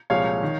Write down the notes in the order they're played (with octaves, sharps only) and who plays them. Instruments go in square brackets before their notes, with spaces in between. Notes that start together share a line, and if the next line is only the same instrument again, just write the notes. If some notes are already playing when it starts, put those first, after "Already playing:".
[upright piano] C2 A#2 F3 G#3 C#5 F5
D#3